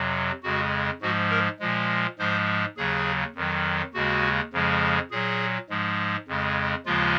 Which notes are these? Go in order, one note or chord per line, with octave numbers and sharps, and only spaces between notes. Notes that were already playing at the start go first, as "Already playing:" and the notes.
Already playing: F2 C3 F#3
F2 C#3 G#3 F#4
G#2 F3 G#3 F#4
A#4
A#2 F3 G#3
G#2 F3 G#3 C5
D#2 C#3 F#3 G#4
F2 D#3 F#3
D#2 C#3 G#3 F#4
F2 C#3 F3 G#3
A#2 F#3 G#4
G#2 F3 G#3
F2 C#3 G#3
D#2 C#3 F3 G#3 F4